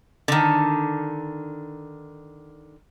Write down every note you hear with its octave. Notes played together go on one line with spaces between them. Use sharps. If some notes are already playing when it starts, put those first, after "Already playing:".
D3 D#3